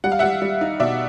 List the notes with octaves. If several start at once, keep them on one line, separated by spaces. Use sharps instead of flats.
G3 F#5
F5
G3 E5 F#5
G3
D#4
B2 D5 E5